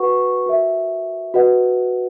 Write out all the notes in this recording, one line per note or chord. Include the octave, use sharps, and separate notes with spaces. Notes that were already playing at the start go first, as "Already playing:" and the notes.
Already playing: F#4 B4 F#5 C#6
F#4 A#4 E5
F#4 B4 D#5 F#5